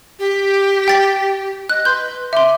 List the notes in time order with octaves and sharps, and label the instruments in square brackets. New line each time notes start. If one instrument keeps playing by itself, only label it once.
[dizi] G4
[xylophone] G5 A6 B6
[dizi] D#5 [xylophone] F#6
[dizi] B4 [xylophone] C6 G6
[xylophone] E5 C6 [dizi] D6